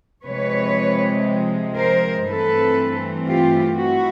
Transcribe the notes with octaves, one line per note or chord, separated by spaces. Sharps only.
C3 F3 G#3 B4 C#5
A#4 C5
G2 E3 A3 C4 A4 B4
F4 G4
E4 F#4